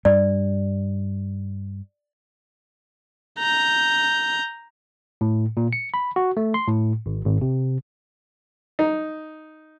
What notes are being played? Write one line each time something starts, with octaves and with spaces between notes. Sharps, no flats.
G2 G3 D5
A#5 G6
A2
A#2
C#7
B5
F#4
A3
C6
A2
G#1
G#1
C3
D#4